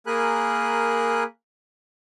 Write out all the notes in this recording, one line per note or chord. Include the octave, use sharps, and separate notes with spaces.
A#3 G#4 A#4 G#5 B5 F#6